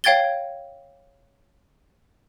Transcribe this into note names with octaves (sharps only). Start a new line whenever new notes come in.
C#5 F5 G5 G#6 A6 G7